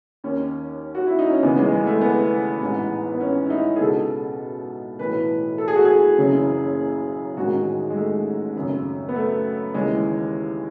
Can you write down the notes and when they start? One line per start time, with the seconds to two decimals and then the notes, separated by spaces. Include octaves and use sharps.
0.24 D#2 D#3 C#4
0.95 F#4
1.07 E4
1.19 D#4
1.30 C#4
1.42 F#1 E2 C#3 E3 B3
1.57 G#3
1.72 G#3
1.86 A3
2.01 B3
2.61 A1 G#2 E3
3.14 B3
3.20 C#4
3.46 E4
3.50 D#4
3.76 G#4
3.80 C#2 B2 A4
4.99 B1 A2 E3 B4
5.58 A4
5.68 G#4
5.76 F#4
5.85 G#4
6.18 F#1 F#2 C#3 E3
7.36 A1 G#2 D#3 F#4
7.90 G#3
7.96 A3
8.56 G#1 F#2 C#3
9.09 B3
9.15 A3
9.74 D#2 C#3 E3 G#3